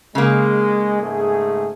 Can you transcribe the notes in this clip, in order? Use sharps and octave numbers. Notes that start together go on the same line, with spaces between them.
C#3 G#3 A#3
G#2 A3 G#4